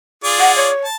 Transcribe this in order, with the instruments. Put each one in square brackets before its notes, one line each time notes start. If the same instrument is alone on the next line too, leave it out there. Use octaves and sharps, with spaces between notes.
[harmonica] F4 G#4 D5
[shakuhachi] F#5
C#5
[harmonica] A5